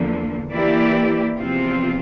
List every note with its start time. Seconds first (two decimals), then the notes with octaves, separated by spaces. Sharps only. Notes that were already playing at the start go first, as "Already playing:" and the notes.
Already playing: E2 D3 F3 A#3
0.51 E3 A#3 E4 G4 D5
1.37 E2 C3 F3 C4 F4